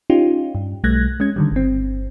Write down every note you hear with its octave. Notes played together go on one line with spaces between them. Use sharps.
C#4 D#4 F4 G4
G2
B1 G3 A3 F#6 G#6 A#6
G#3 C#4 G#6
D3 D#3 G3
G1 C4